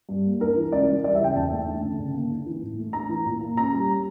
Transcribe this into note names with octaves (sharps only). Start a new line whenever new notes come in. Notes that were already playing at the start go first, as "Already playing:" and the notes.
G2
A#3
D4 A#4
E3
C#2 D5
E3
G3 D5
E5
C#3 G5
E2 A5
A3
D4
D3
C#3
A#3
D4
E3
A2
A3
D4 A#5
E3
A#2
A#3
C#4 A#5
G3